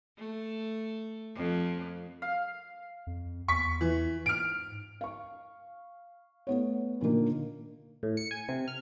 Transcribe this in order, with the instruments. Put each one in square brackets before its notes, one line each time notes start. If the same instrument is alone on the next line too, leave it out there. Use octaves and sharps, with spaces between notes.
[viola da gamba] A3
F2
[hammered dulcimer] F5
[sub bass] F2
[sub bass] E2 [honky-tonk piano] C#6 B6
[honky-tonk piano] E3
[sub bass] G#2 [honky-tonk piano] F6 D7
[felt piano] F5 C#6
A3 B3 C#5
A#2 D3 D#3 A#3
[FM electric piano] A2
C#7
G#5
C3
F6